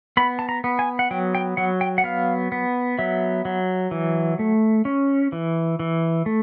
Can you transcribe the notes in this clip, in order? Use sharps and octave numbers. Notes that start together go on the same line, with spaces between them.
B3 B5
A5
A#5
B3
G#5
F#5
F#3 G5
G5
F#3 F#5
G5
F#5
B3 F5
B3
F#3 E5
F#3
E3
A3
C#4
E3
E3
A3